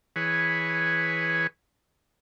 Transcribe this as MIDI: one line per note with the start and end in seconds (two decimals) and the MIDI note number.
0.16 1.47 52
0.16 1.47 68
0.16 1.47 71
0.16 1.47 73